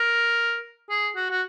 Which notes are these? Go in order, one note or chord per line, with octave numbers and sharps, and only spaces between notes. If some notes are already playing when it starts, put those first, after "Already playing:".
Already playing: A#4
G#4
F#4
F#4